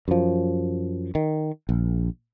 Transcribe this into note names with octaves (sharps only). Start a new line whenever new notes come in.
F#2 F3
D#3
A#1